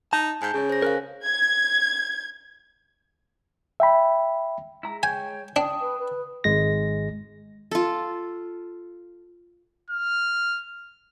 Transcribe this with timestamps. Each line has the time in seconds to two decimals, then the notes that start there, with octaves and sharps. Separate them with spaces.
0.13 D#4 A5
0.42 G#2 G#5 G6
0.54 C#3 G#4 C#5
0.70 C5 A#6
0.82 A#4 F5 G#5 F#6
1.26 G#6
3.80 E5 G5 B5
4.83 G#3 E4 A#5
5.03 C#5 G5 G#5 G6
5.56 D4 G5 A5 D#6
5.81 B4
5.99 B4
6.44 G#1 G#3 A#6
7.71 F4 A4
9.90 F6